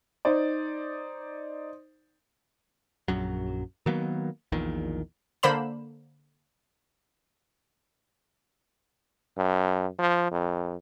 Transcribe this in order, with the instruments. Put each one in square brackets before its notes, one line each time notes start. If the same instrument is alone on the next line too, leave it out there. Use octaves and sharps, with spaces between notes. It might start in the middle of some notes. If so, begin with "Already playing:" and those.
[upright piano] D#4 C5 D5
[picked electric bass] A#1 F#2 F#3
D#3 F#3 A#3 B3
A#1 E2 A#2 D#3
[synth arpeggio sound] D3 A#3 C5 B5 E7
[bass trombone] F#2
F3
F2